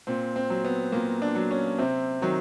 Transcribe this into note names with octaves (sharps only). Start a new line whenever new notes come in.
A#2 C4
C4
F#3
B3
A#2 A#3
D4
F#3
C#4
C3 C4
D#3 F#3